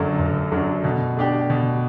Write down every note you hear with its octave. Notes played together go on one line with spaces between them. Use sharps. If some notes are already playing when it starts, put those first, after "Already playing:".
Already playing: G1 F#2 F#3 A3 D4
G1
F#2 F#3 A3 D4
B2
A3 D4 G4
B2